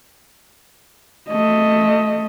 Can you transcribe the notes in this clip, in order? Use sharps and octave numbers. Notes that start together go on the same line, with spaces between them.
A3 D#5